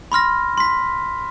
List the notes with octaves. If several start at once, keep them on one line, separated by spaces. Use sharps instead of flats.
B5 C6 F6 A#6
C6 B6